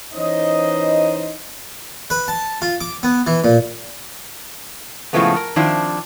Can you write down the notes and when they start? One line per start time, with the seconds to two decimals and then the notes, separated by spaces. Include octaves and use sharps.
0.14 E3 C#4 D#4 C5 D#5
2.10 B4
2.28 A5
2.62 F4
2.81 D6
3.03 B3
3.27 E3
3.44 A#2
5.13 A2 C#3 F3 G#3 A3 B3
5.36 A#4
5.56 D#3 F3 C4 D4 E4